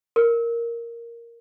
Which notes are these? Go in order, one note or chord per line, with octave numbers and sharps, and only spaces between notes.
A#4